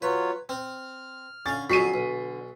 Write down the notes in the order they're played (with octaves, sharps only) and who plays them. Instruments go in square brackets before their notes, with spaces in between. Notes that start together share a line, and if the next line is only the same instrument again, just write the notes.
[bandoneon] F#3 F4 C#5 [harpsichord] B4
[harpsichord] C4 [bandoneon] F6
[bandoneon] D3 [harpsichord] C#4 F5 [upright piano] A6
[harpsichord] F2 F#3 [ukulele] F#4 G#4 [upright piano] B6 C7 D#7
[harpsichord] B1